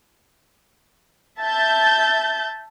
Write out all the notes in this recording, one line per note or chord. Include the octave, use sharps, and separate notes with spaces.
E5 A5 G6 A6